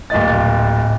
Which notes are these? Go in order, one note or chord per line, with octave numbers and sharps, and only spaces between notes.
D1 A#2 D#5 A6